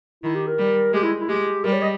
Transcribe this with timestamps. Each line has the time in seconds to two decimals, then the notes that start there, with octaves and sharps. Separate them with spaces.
0.23 D#3 E4
0.35 G4
0.47 A#4
0.59 G3
0.93 G#3 G4
1.03 E4
1.20 E4
1.29 G#3 G4
1.64 G3 A#4
1.73 C#5
1.82 D#5